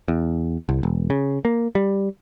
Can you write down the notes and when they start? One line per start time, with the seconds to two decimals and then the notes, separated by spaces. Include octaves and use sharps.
0.08 E2
0.69 C2
0.83 E1
1.10 C#3
1.45 A#3
1.75 G3